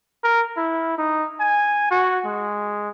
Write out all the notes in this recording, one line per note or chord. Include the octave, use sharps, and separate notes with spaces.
A#4
E4
D#4
G#5
F#4
G#3